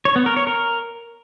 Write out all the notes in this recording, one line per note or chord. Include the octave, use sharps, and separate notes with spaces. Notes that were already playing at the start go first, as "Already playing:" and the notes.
C#5
B3
A#4
C#5
A#4